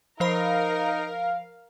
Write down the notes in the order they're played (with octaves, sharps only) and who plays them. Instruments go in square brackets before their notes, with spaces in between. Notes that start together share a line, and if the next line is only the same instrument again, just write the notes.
[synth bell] F3 C5 B5 [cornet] D#4 [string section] A#4 [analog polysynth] F5